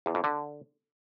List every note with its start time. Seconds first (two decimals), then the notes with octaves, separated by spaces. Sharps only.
0.06 E2
0.15 F2
0.24 D3